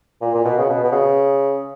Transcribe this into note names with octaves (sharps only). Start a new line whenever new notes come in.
A#2
A#2
B2
C#3
B2
B2
C#3